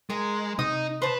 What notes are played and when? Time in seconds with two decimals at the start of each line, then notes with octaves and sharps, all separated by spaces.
0.10 G#3 A#4 G#5
0.59 C3 D#4 D#6
1.02 B4 C5 A5